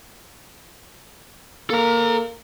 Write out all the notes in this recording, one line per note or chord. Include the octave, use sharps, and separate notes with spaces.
A#3 A4 A#5